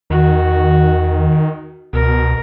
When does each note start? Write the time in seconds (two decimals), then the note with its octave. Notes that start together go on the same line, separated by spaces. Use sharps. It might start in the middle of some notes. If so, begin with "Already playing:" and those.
0.10 E2 D#3 F#4
1.93 C#2 B2 A#4